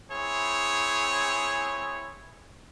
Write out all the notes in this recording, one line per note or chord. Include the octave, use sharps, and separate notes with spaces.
C4 E4 G#4 C#5